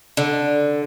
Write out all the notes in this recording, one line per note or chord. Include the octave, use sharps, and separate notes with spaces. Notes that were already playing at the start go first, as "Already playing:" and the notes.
D3